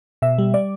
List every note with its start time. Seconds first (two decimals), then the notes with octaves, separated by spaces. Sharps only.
0.22 B2 E5
0.38 G3
0.54 G3 D5